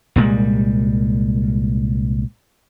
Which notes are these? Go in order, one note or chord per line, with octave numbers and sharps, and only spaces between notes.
C2 A#2 G3 G#3